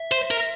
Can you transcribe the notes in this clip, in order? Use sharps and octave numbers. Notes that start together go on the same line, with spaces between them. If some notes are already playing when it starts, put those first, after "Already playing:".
Already playing: E5
C5
A#4